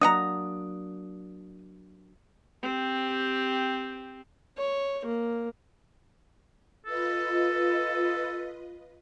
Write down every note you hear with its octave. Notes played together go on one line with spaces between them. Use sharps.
F#3 A#3 D4 D#5 F#5 A#5 D#6
C4 G4
C#5
A#3
F4 A4 B4 D#5